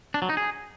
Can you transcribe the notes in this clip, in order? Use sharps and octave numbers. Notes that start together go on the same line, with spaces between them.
D4
F#3
D#4
G#4